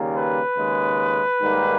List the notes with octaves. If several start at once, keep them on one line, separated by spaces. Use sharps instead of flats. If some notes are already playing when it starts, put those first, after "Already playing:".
Already playing: D#2 C#3 G3 A#3
B4
D#2 C#3 G#3
G#2 D#3 G3 A#3